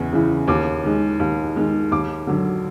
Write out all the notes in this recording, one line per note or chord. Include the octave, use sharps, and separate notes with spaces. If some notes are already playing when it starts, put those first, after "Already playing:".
Already playing: E2 C#3 E3
C#3 E3
D#2 D6
D#3 G#3
D#2
D#3 G#3
D#2 D6
D3 F#3